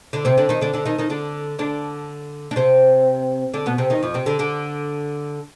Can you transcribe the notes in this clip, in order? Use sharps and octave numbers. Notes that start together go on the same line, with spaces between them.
D3 D4
C3 C4
D3 D4
D#3 D#4
D3 D4
D3 D4
D#3 D#4
D#3 D#4
D3 D4
D3 D4
D4
C3 C4
D3 D4
B2 B3
C3 C4
D#3 D#4
F2 F3
C3 C4
D3 D4
D3 D4